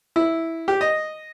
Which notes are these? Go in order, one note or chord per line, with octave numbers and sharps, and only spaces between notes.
E4
G4
D#5